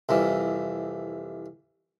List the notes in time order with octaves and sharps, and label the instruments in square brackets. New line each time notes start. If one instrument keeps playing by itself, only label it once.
[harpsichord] C2 F2 E3